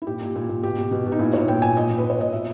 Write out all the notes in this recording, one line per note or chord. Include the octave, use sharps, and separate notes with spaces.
E4
A#2 G4
A#2
A#2
A#2
B2 G4
B2
B2
B2
D#4
A#2 E4
A#2 C#5
A#2 G5
A#2 G#5
A#2 D#5
A#2
B4
A#2
C#5
A#2 D#5
B2 E5